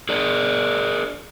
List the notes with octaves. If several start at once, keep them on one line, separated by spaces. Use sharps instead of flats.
G#4 A#4 D5